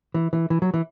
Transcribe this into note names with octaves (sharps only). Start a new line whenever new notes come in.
E3
E3
E3
F#3
E3